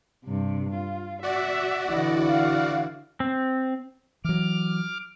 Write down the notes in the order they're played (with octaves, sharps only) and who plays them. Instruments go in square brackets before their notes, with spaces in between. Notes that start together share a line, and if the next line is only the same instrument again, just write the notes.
[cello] G2 C3
F4
[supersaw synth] F#4 D5 F#5 [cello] E5
[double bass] D3 E4 [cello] E3 [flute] D#5
[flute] F5
[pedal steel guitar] C4
[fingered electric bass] E3 F#3 [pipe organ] D6 F6